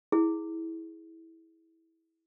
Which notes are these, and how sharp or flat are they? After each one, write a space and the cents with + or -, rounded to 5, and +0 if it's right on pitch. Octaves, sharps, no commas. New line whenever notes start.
E4 -15 G#4 +10